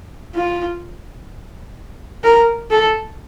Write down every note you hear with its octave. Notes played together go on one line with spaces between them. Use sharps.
F4
A#4
A4